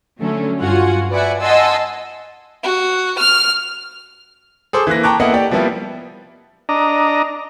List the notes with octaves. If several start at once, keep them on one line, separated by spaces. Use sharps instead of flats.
D3 F#3 A3 C#4
G2 F4 F#4 F#5 G#5
B4 D5 E5 F#5 G#5
D#5 F#5 G#5 A5 C6 E6
F#4
F6
G#4 A4 C5 D6
E3 A#3 F#6 A#6
G5 A5 A#5 C#6 D6 F#6
A#3 B3 E4 A4 D#5 F#5
G4 D5
F3 G3 A#3 B3 E4
D4 D#5 A#5